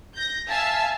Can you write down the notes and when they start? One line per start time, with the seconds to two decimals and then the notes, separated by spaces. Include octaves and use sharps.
0.14 G6 A#6
0.48 E5 F5 G#5 A5 E6